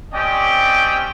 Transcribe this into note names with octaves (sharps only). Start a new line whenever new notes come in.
C4 C#4 G4 D5 D#5 G5